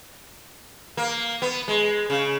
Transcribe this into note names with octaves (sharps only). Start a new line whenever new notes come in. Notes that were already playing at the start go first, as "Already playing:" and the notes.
A#3
B3
G#3
C#3